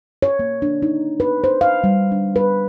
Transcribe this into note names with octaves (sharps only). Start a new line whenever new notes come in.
C#5
A#3
D4
D#4
B4
C5
F5
G3
D4
B4